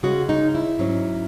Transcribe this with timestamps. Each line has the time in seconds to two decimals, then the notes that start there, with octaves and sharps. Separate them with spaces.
0.03 C#3 G#3 C#4 F#4
0.29 D#4
0.55 E4
0.79 G#2 F#3 C#4